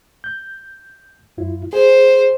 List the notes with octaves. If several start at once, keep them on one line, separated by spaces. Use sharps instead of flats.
G6
F#2 E4 F4
G#4 C5